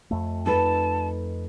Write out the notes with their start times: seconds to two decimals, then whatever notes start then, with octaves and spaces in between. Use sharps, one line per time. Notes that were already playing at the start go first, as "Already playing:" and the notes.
0.11 F2 A3
0.46 D#4 A4 B4 A5